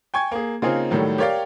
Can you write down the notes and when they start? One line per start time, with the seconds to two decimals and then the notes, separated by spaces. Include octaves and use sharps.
0.14 G5 G#5 C#6 G#6
0.31 A#3 G#4
0.62 C#3 A#3 C4 D#4 F4 G#4
0.91 A2 D#3 F#3 G3 A3
1.18 G4 A#4 C#5 D5 F5 G5